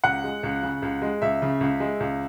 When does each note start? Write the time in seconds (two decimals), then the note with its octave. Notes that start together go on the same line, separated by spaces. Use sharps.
0.04 C#2 F#5
0.24 G#3
0.43 C#2
0.63 C#3
0.82 C#2
1.02 G#3
1.22 C#2 E5
1.42 C#3
1.61 C#2
1.80 G#3
2.00 C#2